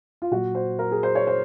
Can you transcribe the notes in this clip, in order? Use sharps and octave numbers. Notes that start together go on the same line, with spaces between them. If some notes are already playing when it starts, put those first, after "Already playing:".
F4
A#2 F#3 F#4
C5
A#4
G#4
C5
C#5
C5